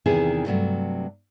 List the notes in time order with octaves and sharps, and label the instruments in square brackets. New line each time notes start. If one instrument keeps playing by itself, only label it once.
[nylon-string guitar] E2 C3 D#3 E3 E4 G#4
G2 C3 F#3 A3